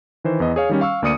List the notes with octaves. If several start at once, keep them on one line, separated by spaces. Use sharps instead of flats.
D#3 E3 C5
E2 B3 D#5
G#4 C#5 F5
D#3 G3 C#4
F5 C#6 E6
D2 A#3 D5 D#6 C#7 D#7